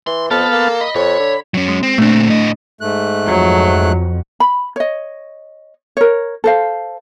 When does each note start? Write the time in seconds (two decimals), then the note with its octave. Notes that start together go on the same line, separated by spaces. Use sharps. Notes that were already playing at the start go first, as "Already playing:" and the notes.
0.07 E3 C6
0.31 F2 B3 A4 F5 A5
0.52 A#3
0.81 D#5 B5
0.95 F2 C#5
1.20 D3
1.54 F#3 C#4
1.68 G#3
1.83 C4
1.98 A#2 A3 C4 D4
2.28 A2 D#5
2.81 G#2 A3 F#6
3.27 F2 F#3
4.40 B5
4.76 C#5 D#5
5.97 A#4 C#5
6.44 A4 C5 F5